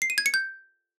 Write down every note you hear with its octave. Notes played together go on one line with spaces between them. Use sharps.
C7
D#7
G#6
C#7
G6